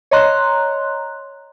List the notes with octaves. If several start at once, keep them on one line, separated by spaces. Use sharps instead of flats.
C#5 D#5 A#5 C6 F#6